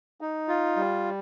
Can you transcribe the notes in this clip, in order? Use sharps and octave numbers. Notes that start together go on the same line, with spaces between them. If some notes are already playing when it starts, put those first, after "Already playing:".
D#4
F4
G3